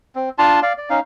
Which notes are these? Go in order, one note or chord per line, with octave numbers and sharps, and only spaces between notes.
C4
D4 F4 A5 C6
D5 F5
D5
C#4 D#4 F5